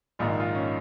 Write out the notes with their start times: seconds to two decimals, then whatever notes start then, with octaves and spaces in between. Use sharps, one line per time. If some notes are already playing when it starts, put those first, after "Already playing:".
0.19 A#1 G#2 D#3 F4
0.30 D#4
0.40 F4
0.55 C#4